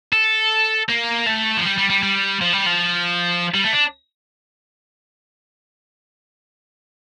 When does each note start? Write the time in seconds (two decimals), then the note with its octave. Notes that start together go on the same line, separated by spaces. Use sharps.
0.13 A4
0.89 A#3
1.27 A3
1.57 F3
1.65 G3
1.78 G3
1.90 G3
2.03 G3
2.41 F3
2.53 G3
2.66 F3
3.54 G3
3.64 A3
3.73 D4